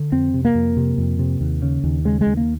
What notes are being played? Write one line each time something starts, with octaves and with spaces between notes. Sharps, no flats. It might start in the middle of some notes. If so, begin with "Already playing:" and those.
Already playing: D3
F2 C4
C3
A#3
F2
C3
F2
C3
D#2
C#3
D#2
C#3 G#3
G#3
D#2
A#3